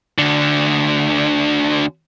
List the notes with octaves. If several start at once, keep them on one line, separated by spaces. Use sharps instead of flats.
D2 D3